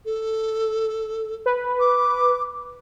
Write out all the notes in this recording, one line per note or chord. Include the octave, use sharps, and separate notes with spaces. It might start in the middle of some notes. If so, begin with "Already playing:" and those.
A4
B4
D6